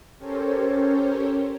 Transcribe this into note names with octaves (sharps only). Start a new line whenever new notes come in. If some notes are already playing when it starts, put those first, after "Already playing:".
C#4 G4 A4 A#4 C5 C#5